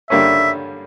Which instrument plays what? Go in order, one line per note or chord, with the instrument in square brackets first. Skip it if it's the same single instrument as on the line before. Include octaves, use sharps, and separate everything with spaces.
[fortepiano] G2 D3 G3 A#3 C#4 [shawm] E5